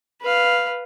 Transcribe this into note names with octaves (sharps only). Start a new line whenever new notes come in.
B4 F5